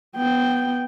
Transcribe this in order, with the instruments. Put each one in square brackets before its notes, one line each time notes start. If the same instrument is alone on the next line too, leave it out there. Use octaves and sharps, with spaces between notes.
[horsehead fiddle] B3 G5